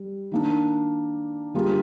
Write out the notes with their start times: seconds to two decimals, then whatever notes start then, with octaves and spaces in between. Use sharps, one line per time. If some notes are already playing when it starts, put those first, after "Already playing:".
Already playing: G3
0.32 D#3 A#3 D4
1.54 D3 G3 A#3 F4 G#4